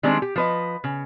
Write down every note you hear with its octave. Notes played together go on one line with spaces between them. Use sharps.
D#3 G3 G#3 C4 D4
G4
F3 B4 D#5
C#3